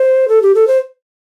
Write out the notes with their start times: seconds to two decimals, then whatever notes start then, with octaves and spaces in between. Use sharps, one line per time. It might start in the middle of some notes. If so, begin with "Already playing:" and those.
Already playing: C5
0.28 A4
0.42 G4
0.55 A4
0.67 C5